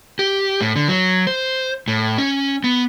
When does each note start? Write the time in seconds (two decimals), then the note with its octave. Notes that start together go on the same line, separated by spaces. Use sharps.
0.19 G4
0.61 A2
0.76 D3
0.88 F#3
1.27 C5
1.88 A2
2.18 C#4
2.64 B3